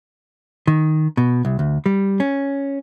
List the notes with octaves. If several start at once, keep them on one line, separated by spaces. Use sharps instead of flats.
D#3
B2
C2
D2
G3
C#4